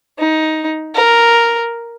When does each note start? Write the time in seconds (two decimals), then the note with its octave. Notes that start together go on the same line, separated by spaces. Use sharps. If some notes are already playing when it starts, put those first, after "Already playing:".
0.19 D#4
0.95 A#4